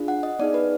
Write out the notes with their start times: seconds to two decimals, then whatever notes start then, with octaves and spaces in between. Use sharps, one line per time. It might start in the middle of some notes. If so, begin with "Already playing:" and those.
Already playing: D4 F4 G#4
0.08 F#5
0.23 D#5
0.39 B3 D#4 G#4 D5
0.54 B4